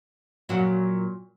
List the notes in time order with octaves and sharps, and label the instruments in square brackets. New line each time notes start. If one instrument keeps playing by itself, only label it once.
[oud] A#2 F#3 F#4